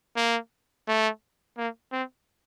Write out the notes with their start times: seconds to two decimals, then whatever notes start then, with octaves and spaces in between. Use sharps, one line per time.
0.16 A#3
0.88 A3
1.58 A#3
1.92 C4